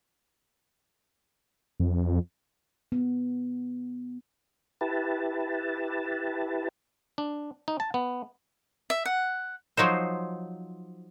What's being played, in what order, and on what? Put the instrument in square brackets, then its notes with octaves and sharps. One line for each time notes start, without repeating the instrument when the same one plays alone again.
[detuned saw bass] F2
[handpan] B3
[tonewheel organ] E4 G4 B4 A5
[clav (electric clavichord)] D4
D#4
A5
B3
[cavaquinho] E5
F#5
[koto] F3 F#3 D#4 C5